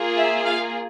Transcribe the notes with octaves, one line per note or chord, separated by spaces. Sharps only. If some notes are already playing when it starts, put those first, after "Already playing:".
Already playing: A#3 F4 G#4
E5
F5